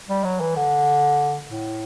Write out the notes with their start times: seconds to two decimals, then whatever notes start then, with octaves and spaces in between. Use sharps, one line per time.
0.09 G3
0.24 F#3
0.40 E3
0.56 D3
1.50 A2